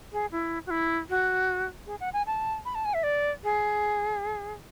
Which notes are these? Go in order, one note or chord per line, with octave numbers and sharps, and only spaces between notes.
G#4
E4
F#4
E4
F#4
G#4
F#5
G#5
A5
B5
A5
G#5
E5
D5
G#4